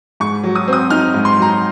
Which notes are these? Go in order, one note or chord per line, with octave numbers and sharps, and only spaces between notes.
G#2 C#6
F#3
D#6
C4 D#6
D#4 F6
G#2
C6
F#3
A#5